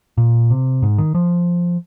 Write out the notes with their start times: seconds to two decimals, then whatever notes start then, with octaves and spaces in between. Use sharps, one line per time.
0.18 A#2
0.50 C3
0.82 G#2
0.98 D#3
1.15 F3